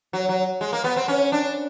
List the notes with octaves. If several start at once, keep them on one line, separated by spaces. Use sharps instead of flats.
F#3
F#3
G#3
A#3
B3
C4
C#4
D4